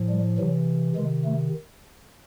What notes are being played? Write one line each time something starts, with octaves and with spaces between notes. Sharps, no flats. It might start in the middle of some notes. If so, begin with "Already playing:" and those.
Already playing: A2 F3
G3
C3 E3 F#3
C3 D#3 G#3
A3